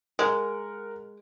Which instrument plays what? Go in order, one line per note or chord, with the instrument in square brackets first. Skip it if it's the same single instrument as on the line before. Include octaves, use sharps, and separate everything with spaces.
[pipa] G#3 [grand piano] A#4 F#5